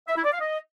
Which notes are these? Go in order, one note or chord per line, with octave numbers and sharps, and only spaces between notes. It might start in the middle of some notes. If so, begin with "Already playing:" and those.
E5
E4
D5
F5
D#5